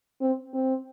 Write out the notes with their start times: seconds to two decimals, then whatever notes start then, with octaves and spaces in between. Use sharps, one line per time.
0.21 C4
0.54 C4